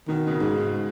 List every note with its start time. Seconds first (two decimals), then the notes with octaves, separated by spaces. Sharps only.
0.08 B2 D#3
0.27 B2
0.31 C#3
0.40 G#2
0.55 G#3